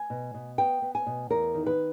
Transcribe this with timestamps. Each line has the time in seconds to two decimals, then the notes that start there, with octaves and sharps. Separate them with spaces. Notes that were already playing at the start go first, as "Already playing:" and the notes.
Already playing: G#5
0.10 B2
0.34 B2
0.58 B3 G5
0.82 B3
0.95 G#5
1.07 B2
1.30 E2 A#4
1.54 D#3
1.67 B4